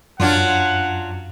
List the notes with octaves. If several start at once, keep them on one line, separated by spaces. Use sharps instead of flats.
F#2 F#3 D4 F4 F#5